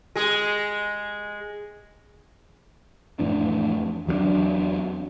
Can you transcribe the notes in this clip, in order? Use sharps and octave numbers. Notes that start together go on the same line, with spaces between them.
G#3 G#4
F2 A2 E3 D4
E2 F#3 G3 D4